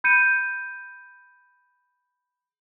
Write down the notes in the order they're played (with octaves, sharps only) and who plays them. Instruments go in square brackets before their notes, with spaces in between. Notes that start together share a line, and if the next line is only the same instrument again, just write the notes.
[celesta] B5 G6 C#7 D#7